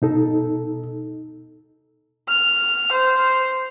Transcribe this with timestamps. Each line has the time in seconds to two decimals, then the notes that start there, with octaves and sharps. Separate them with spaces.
0.02 B2 D#4 A4
2.28 F6
2.92 C5